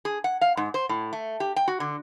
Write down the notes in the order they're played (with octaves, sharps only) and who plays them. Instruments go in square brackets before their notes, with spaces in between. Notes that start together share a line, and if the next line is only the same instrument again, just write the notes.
[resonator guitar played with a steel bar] G#4
F#5
F5
G#2
C5
A2
A3
G4
G5
F#4
D3